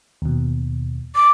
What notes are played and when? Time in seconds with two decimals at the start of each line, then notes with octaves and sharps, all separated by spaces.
0.22 D#2 B2
1.16 D6